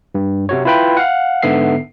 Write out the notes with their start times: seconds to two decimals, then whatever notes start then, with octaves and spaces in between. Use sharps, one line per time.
0.15 G2
0.49 C3 F#4 C#5
0.65 E4 F4 B4 G5 B5
0.97 F5 F#5
1.42 G#2 D3 B3 E5 C7